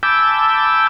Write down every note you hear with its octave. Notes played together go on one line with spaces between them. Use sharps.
G#5 A5 B5 D6 E6 G6